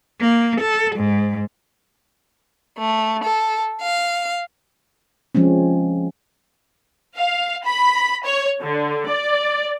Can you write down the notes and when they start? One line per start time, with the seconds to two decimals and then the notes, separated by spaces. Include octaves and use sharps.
0.21 A#3
0.61 A4
0.96 G#2
2.79 A3
3.24 A4
3.82 F5
5.35 F3 G#3 C4 C#4
7.17 F5
7.65 B5
8.25 C#5
8.61 D3
9.08 D5